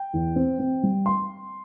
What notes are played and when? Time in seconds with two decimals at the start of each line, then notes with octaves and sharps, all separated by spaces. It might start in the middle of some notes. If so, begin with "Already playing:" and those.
Already playing: G5
0.13 E2
0.36 C4
0.59 C4
0.83 G3
1.06 C6